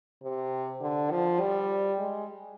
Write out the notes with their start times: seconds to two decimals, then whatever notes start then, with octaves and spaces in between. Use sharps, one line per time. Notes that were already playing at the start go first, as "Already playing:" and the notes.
0.23 C3
0.81 D3
1.11 F3
1.40 G3
1.99 G#3